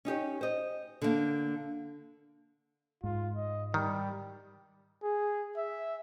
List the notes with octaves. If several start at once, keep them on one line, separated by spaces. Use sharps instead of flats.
C#4 D#4 G4 C#5
C5 D#5
D3 A#3
G#2 F4
D#5
D#3 G3
G#4
E5